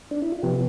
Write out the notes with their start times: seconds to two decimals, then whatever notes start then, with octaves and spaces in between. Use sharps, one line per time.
0.11 D4
0.22 E4
0.32 F4
0.43 C3 F3 B3 G4